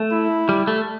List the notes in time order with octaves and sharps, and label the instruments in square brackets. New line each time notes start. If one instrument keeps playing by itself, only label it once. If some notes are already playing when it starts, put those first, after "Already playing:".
Already playing: [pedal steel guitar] A3
[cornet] E4
[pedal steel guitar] G3
A3